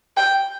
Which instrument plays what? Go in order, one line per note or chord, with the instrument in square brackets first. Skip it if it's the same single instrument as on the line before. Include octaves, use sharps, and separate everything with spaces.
[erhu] G5